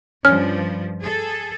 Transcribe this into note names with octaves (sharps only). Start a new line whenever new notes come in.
G2 F3 G3 C#4 F6
G#4 A4